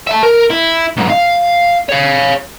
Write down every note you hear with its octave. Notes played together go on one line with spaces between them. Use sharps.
E5 A5
A#4
E4
B1 G#2
F5
C#5 F5